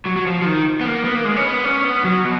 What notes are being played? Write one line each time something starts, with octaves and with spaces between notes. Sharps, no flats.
F#3
F#3
F3
F3
D#3
B3
A#3
B3
A#3
G#3
C#4
B3
C#4
B3
F#3
B2